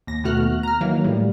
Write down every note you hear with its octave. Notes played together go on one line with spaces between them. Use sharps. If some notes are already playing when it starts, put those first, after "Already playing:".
D#2 A#6
D#2 B2 A3 F#4 F6 F#6
A#5 F6
D#3 E3 F#3 A#3
A2 G3